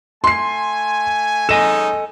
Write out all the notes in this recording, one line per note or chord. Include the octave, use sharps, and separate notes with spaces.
A3 G#5 C6 C7
G#3 C#4 D#4 A4 D#5 G#5 E7